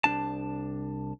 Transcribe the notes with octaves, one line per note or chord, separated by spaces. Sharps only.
C2 E3 D4 A5